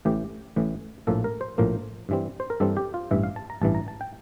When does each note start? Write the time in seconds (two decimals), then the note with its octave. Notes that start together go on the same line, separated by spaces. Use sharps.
0.05 A1 A2 E3 G4
0.56 A1 A2 E3
1.07 A#1 A2 F3 A#3 A4
1.24 A#4
1.41 C5
1.58 A#1 A2 F3 A#3 A#4
2.09 G2 E3 G3 C4
2.40 C5
2.50 A#4
2.60 G2 E3 G3 C4 A4
2.77 G4
2.94 F4
3.11 A1 G2 E3 E5
3.23 F5
3.36 A5
3.50 A#5
3.62 A1 G2 E3 A5
3.75 A#5
3.88 A5
4.01 G5